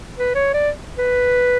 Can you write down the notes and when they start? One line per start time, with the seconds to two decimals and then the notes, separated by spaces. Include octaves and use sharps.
0.18 B4
0.35 C#5
0.54 D5
0.98 B4